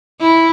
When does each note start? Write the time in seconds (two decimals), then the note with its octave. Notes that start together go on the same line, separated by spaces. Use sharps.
0.21 E4